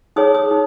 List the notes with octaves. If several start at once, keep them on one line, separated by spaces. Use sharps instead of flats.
D#4 G#4 C#5 D#6
D#6
D#4